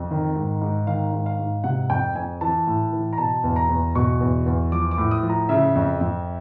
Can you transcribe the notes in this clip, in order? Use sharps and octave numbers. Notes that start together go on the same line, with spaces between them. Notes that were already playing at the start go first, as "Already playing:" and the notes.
Already playing: F2
D#3
G#2
G#2
D#3 F5
G#2
F5
G#2
C3 F#5
F2 G5
F2 G#5
E3 A5
A2
E3
A#5
B2 A5
E2
A#5
E2
B2 C#6
E2
E2
F3 D6
D6
A2
D#6
F3
A#5
C#3 E5
F2
F2